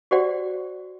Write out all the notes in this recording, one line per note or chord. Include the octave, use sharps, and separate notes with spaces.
F#4 G4 C5 D5 F#5